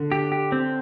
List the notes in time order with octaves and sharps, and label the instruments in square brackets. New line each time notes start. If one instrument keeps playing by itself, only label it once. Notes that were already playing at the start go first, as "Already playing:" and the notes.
Already playing: [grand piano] D3
[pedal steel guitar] G4
G4
C4